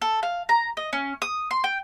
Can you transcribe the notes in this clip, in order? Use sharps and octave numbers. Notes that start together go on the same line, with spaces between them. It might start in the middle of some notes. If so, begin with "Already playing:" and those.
A4
F5
A#5
D#5
C#4
D#6
C6
G5